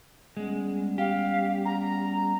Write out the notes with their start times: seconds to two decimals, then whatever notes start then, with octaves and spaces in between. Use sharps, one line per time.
0.37 G3 G#3 B3 C#4
0.98 G4 F5
1.65 A#5